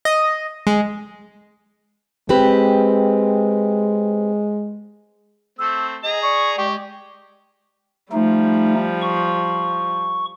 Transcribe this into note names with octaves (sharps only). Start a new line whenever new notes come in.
D#5
G#3
G#3 C4 G4 B4
A3 C4 E6
G#4 D#5 A#5
D5 C#6
G#3 G4 C#6
F3 G3 A3 D#4
C#6